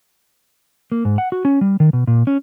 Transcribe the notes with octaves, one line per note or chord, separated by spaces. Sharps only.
A#3
G#2
F#5
F#4
C#4
G3
D#3
B2
A#2
C#4